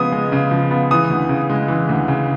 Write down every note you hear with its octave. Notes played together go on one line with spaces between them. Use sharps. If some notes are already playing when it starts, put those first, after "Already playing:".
Already playing: C#3 F3 G#3 B3 D#6
G#3
C#3
F3
B3
E3 D#6
D2
C#3
G#3
E3
D2
C#3